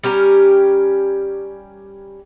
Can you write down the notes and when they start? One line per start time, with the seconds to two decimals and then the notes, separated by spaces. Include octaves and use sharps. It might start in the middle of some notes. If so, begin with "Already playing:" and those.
0.03 G3 C#4 G4 A#4